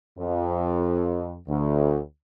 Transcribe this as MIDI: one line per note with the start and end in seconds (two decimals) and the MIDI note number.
0.19 1.37 41
1.47 1.98 38